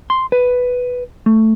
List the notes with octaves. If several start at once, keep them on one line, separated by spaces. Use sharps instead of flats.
C6
B4
A3